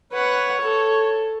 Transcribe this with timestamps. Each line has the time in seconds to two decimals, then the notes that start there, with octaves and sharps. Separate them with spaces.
0.13 B4 C#5 F#5
0.61 A4